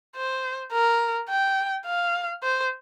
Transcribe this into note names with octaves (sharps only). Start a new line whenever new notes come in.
C5
A#4
G5
F5
C5